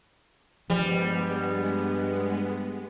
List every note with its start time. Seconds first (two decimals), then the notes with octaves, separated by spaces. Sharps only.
0.70 G2 F3 G3 G#3 B3